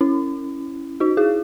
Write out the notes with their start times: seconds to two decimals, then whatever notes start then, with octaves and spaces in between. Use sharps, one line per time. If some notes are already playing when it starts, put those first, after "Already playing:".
0.01 C#4 E4
1.00 D#4 F#4
1.17 E4 G#4